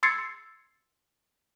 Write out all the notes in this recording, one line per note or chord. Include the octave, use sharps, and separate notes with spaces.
C6 E6 G#6 A6 C7 C#7